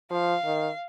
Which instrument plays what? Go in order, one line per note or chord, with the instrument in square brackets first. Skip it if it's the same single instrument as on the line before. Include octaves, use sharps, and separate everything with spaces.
[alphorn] F3 [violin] F5
[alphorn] D#3